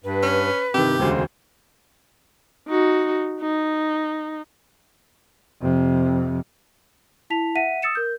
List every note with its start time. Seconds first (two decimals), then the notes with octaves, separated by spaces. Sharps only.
0.04 G2 B4
0.23 C#4
0.74 G2 C3 D#3 G4
1.00 E1 D2 C#3 G#3 C5
2.68 D#4 F#4
3.41 D#4
5.62 F2 C3
7.30 E4 A5 B6 F7
7.55 E5 F#5 B6 D#7
7.82 D#6 E6 A6 C#7 E7
7.95 A#4 G6